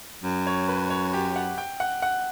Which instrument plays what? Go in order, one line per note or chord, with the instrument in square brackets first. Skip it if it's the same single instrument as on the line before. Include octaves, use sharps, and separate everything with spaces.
[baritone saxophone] F#2
[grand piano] C#5
B4
C#5
G4
F#5
G5
F#5
F#5